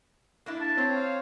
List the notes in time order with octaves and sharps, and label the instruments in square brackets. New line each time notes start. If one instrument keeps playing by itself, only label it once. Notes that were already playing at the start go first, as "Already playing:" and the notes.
[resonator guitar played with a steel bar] A#3 D4 E4
[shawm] A5
[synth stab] C4 [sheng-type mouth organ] C5 C#5
[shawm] F5